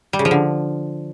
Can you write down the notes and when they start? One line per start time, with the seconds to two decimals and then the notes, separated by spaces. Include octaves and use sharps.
0.13 G3
0.19 C#3
0.25 F3
0.31 D3